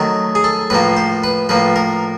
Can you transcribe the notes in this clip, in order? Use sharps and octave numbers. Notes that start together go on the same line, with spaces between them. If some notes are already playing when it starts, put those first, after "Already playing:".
Already playing: D#3 F#3 A3
G#4
A4
A2 F3 A#3 B4
C5
B4
A2 F3 A#3 B4
A#4